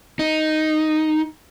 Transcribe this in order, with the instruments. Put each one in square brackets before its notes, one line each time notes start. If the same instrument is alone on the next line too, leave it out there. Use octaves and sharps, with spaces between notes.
[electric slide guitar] D#4